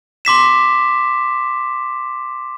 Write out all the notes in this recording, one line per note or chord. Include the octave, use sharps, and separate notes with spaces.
C6 D6 B6 E7